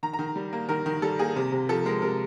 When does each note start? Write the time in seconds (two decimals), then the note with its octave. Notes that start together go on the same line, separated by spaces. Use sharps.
0.03 D#3 A#5
0.13 A#5
0.19 D#3
0.36 G3
0.53 A#3
0.69 D#3 A#4
0.86 D#3
1.02 G3 A4
1.19 A#3 G#4
1.36 C3
1.52 C3
1.69 F3 A4
1.86 G#3 A#4
2.02 C3 A#4